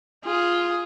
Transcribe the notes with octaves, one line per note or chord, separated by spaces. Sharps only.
F4 G#4